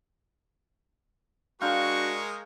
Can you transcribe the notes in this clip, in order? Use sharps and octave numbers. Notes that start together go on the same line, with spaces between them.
G#3 D4 F#4 A#4 F5 G5 C#6